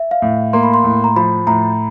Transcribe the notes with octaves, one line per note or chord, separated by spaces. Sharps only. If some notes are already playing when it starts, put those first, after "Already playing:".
Already playing: E5
F5
A2
A#3 C6
B5
C6
A2
A#5
F3 B5
A2 A#5